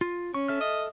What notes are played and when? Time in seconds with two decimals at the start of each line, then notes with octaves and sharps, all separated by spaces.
0.01 F4
0.34 C#4 C#6
0.48 A4 E5 F6
0.61 D#5